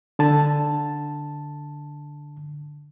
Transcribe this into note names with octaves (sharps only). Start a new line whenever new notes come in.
D3 A5